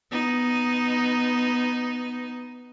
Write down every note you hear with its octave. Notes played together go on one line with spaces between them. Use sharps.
B3 D#4